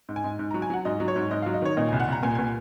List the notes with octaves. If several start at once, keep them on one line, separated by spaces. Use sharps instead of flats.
G#2
G#5
G#2
G#2
A#5
F#3
G#5
F#3 F#5
G#2 D#5
F#3
C#5
G#2
G#2 D#5
F5
F#3
D#5
D#3 C#5
A#2 D#5
C2 G#5
F#5
C2 A#5
A#2 G#5
A#2 G#5